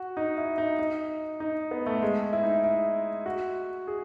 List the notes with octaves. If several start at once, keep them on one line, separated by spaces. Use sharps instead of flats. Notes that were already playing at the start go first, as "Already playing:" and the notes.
Already playing: F#4
D#4
E4
D#4
D#4
D#4
B3
A3
G#3
E4
D#4
E4
F#4
G#4